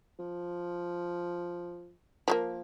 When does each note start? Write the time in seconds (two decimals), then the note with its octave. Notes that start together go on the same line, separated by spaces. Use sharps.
0.19 F3
2.28 F3 A3 A#3